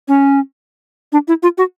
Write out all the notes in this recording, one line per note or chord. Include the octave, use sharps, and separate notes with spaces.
C#4
D4
E4
F4
F#4